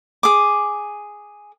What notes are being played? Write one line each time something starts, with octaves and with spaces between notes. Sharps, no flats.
G#4 D6